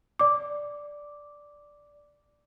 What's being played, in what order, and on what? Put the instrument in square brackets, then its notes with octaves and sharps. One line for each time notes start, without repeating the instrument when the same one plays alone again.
[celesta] D5 D6